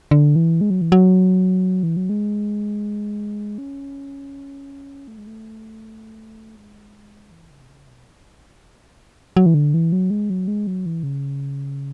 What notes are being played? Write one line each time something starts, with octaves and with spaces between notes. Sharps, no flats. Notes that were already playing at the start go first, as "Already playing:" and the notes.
D3
E3
G#3
F#3
E3
F#3
E3
F#3
G#3
C#4
A3
G#3
A3
G#3
E3
C#3
B2
C#3
B2
F#3
E3
D3
E3
F#3
G#3
F#3
G#3
F#3
E3
C#3